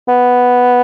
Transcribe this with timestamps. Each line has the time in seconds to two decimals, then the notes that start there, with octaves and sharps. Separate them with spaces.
0.08 B3